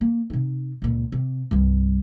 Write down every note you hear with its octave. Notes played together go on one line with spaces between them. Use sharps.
A#3
C3 D#4
C#2 A#2
C3
C2 G2